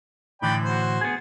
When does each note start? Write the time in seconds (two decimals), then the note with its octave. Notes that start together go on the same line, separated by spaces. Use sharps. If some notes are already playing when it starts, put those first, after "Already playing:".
0.42 A2 D3 E3 D5 G5 B5
0.64 F#4 C5
1.01 B3 G#4